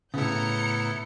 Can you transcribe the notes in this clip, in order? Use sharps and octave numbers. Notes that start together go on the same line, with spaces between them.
A2 C#3 B3 E4 A#5 G6 C#7